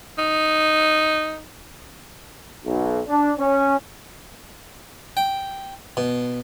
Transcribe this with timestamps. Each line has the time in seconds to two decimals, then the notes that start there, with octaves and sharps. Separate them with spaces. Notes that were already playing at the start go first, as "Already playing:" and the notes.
0.18 D#4
2.66 B1
3.08 D4
3.39 C#4
5.17 G5
5.97 B2